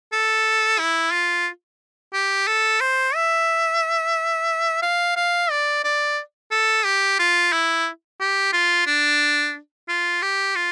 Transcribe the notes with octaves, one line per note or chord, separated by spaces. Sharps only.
A4
E4
F4
G4
A4
C5
E5
F5
F5
D5
D5
A4
G4
F4
E4
G4
F4
D4
F4
G4
F4